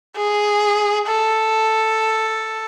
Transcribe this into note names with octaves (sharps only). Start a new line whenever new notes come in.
G#4
A4